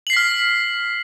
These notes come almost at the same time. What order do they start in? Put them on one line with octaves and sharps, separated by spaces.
F#7 C7 B6 F6